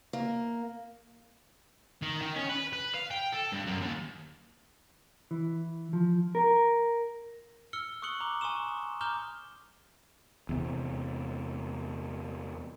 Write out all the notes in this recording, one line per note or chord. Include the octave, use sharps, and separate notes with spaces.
A#3
D#3
D#3
C#4
B4
B4
F5
G5
A4
G2
F#2
D#2
E3
F3
A#4
E6 F6 C#7 G7
C#6 D#6 F#6 C#7 F#7 G7
A#5 D6
G#5 C6 C#6 D#6 E7
A#5 D6 F6 G6 E7 G7
E2 C3